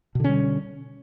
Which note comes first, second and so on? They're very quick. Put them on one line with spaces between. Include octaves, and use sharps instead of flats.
B2 D3 C#4 G3